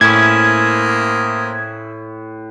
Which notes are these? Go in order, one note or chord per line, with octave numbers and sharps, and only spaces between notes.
A2 A#3 C#4 E4 C5 D#6 G#6